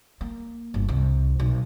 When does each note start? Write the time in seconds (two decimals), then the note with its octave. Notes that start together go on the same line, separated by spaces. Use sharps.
0.21 A#3
0.74 G1
0.89 C2
1.40 B1